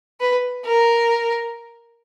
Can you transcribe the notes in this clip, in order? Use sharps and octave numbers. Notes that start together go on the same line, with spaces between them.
B4
A#4